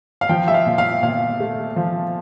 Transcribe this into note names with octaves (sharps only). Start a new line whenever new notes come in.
F5
F3 G5
E5
F5
A#2
F5
A#2 F5
A3
F3